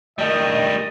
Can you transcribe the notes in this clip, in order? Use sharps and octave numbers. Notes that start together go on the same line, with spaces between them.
D#3 G3 A3 D#5